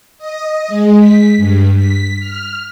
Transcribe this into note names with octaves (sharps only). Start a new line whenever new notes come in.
D#5
G#3
B6
G2
B6
F6